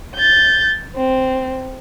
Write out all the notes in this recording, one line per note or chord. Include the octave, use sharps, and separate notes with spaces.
G6 A6
C4